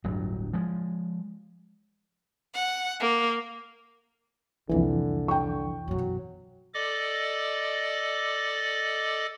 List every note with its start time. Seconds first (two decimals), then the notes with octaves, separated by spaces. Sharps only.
0.04 D1 G1 G2 F#3
0.53 F3 G#3
2.54 F#5
3.00 A#3
4.69 C2 F2 D3 E3 A#3
5.28 G5 C#6
5.88 F#2 B2 F#3
6.74 A4 D5 D#5 D6